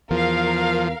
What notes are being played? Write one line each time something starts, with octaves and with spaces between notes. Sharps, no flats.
E2 F3 A#4 F5